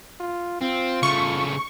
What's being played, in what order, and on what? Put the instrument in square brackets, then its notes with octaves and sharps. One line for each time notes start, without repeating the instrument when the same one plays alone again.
[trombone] F4
[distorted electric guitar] C4 [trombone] F4
[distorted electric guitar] C#3 A3 [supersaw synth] C#6